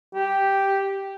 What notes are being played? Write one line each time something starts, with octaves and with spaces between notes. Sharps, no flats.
G4